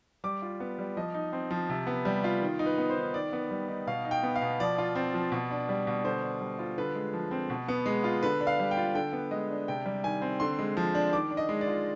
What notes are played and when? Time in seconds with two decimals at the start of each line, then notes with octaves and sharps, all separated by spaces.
0.24 G3 D6
0.42 F4
0.60 B3
0.79 G3
0.97 F3 D#5
1.14 D#4
1.33 C4
1.51 F3
1.69 C3
1.87 B3
2.05 G3
2.24 F4
2.42 D#3
2.59 D#4
2.66 B4
2.78 B3
2.90 C5
2.96 D#3
3.14 D#3 D5
3.33 B3
3.51 G3
3.68 D#4
3.87 B2 F5
4.05 D#4
4.11 G5
4.23 B3
4.36 F5
4.42 B2
4.60 F3 D5
4.78 F4
4.95 C4
5.14 F3
5.32 B2
5.51 D4
5.69 G3
5.87 B2
6.04 D3 C5
6.23 D4
6.41 G3
6.59 F4
6.78 D3 B4
6.95 G#3
7.13 F3
7.31 C4
7.50 B2
7.68 B3
7.86 G#3
8.04 F4
8.23 D3 B4
8.41 D4
8.47 F5
8.59 G3
8.71 G5
8.77 F4
8.95 D3 G5
9.13 B3
9.31 G#3 D#5
9.50 D4
9.68 C3 G5
9.86 G3
10.04 D#3 G#5
10.22 C4
10.40 D3 C6
10.59 G#3
10.77 F3
10.95 D4
11.13 D#3 D6
11.31 D4
11.37 D#5
11.49 G#3
11.61 D5
11.67 F4